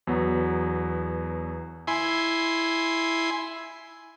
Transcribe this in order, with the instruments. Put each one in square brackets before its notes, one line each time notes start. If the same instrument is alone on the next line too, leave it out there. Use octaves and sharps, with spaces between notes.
[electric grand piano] E2 F#3 B3
[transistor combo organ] E4 G#5 C6